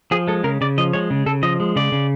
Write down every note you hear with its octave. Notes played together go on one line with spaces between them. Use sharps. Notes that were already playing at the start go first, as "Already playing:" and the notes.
F3 G#4
G#3 A4
C#3 A#4
C#3 D5
F3 D#5
G#3 C#5
C#3
C#3 A4
F3 D#5
G#3
C#3 D5
C#3